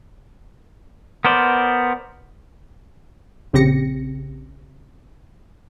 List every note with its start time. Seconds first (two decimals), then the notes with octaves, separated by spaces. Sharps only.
1.25 B3 A#4 C5 D5
3.53 A#1 C#3 C4 G4 A#6 C#7